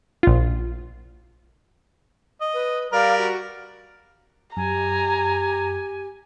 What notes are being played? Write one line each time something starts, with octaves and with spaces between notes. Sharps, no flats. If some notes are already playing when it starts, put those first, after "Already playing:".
A#1 F4
D#5
B4
G3 A#4 D5 F5
F#4
F#2 G4 G#5 A#5